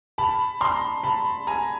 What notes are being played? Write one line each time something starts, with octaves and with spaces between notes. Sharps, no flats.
A5 B5
A#5 C6
A5 B5
G#5 A#5